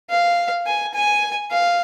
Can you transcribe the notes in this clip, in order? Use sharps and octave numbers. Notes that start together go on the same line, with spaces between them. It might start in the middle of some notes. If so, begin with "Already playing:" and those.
F5
G#5
G#5
F5